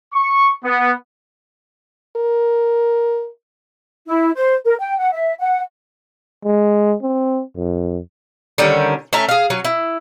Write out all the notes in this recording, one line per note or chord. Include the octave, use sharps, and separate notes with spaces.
C#6
B3
A#4
E4
C5
A#4
G5
F#5
E5
F#5
G#3
C4
F2
D3 D#3 G3 C#4
A3 C#4 E5 A#5
G#4 F5
F#3 C#4
E4